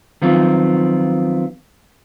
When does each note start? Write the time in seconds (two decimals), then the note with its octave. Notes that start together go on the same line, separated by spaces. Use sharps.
0.22 D#3 F3 F#3 B3 C4 F4